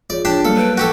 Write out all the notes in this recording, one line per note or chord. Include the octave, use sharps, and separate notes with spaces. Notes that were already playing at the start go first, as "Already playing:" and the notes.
F4 G#4 C#5 D5
D4 F4 G4 G#4 A5
F#3 G3 A#3 A4 F6 C#7
B4 G6 D7
F#4 G4 A4